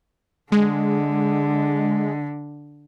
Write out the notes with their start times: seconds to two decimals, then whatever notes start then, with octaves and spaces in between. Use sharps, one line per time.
0.52 D3 G#3